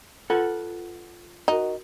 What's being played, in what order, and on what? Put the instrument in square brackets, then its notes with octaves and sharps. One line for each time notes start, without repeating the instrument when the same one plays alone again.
[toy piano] F4 B4 [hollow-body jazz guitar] A4 F#5
[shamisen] D#4 [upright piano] F#4 A#4